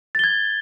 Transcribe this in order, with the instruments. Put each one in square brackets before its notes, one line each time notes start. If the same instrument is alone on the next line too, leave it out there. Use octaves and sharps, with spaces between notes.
[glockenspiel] A6
G7
G#6